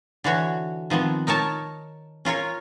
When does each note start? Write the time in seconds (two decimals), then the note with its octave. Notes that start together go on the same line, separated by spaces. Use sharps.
0.24 D3 E3 F#4 C#5
0.90 D#3 F3 B3 C4
1.27 D#4 A#4 C#5 A5
2.25 C#4 F4 A#4 C#5